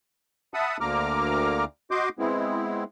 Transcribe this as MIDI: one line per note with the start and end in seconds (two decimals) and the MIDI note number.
0.54 0.77 76
0.54 0.77 78
0.54 0.77 81
0.54 0.77 83
0.54 0.77 87
0.81 1.65 38
0.81 1.65 50
0.81 1.65 58
0.81 1.65 82
0.81 1.65 86
0.81 1.65 89
1.91 2.09 66
1.91 2.09 75
1.91 2.09 84
1.91 2.09 86
1.91 2.09 91
2.19 2.84 56
2.19 2.84 59
2.19 2.84 60
2.19 2.84 64